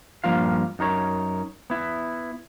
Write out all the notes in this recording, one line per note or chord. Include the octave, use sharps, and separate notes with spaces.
G2 F3 A#3 F4 F5
F#2 D#4 A#4 C#5
B3 E4